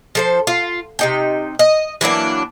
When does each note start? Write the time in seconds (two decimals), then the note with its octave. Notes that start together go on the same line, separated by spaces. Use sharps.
0.15 F3 A4 C5
0.47 F4
0.99 C3 D#4 G5
1.59 D#5
2.01 E3 F#3 A#3 D4